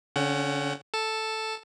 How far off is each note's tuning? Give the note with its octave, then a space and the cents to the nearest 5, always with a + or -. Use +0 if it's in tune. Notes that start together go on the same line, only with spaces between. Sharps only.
D3 -40 C#4 -10 F#5 +30
A4 +0 A5 +0